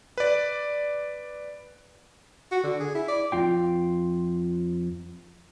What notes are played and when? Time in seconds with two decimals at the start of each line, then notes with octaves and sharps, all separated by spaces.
0.18 B4 D5
2.52 F#4
2.64 D3
2.80 G#4
2.95 E4
3.08 D5
3.32 F2 F4 G5